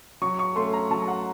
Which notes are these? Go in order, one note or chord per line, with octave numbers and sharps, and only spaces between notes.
F#3 C#6
C#6
A3 C#4 C6
A#5
F#3 A5
F#5